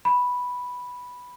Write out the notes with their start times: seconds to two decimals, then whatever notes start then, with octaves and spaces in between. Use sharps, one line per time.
0.05 B5